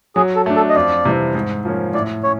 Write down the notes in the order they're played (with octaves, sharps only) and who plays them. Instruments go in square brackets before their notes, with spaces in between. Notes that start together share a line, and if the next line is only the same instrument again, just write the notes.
[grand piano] F#3 [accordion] G#4
[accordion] A4
[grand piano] A3 D4
[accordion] A4
D#5
[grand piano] F2 [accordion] D5
[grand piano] C3 E3 G3 C4
G#2
F3 A#3 C#4
[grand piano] A2 [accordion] D5
[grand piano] C#4 [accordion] C#5